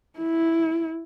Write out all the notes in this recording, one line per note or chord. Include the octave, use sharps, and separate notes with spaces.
E4